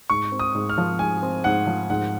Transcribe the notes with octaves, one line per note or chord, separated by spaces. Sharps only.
G#2 C#6
C4
D#6
G#2
F6
F3
G#2 G#5
C4
G#2 F#5
F3
G#2 F#5